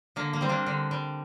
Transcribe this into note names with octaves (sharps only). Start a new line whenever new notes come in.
D3 A#3
A#3
G3 C4
A#3 D4
D3
G3